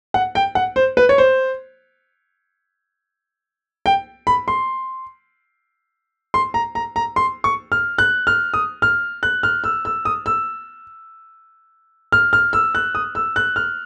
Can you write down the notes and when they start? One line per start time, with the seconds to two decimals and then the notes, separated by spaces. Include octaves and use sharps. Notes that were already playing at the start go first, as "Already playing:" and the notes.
0.14 F#5
0.35 G5
0.55 F#5
0.76 C5
0.97 B4
1.09 C#5
1.18 C5
3.86 G5
4.27 B5
4.48 C6
6.34 C6
6.54 A#5
6.75 A#5
6.96 A#5
7.16 C6
7.44 C#6
7.72 F6
7.98 F#6
8.27 F6
8.54 D#6
8.82 F6
9.23 F#6
9.43 F6
9.64 E6
9.85 E6
10.05 D#6
10.26 E6
12.12 F6
12.33 F6
12.53 E6
12.75 F#6
12.95 D#6
13.15 E6
13.36 F#6
13.56 F6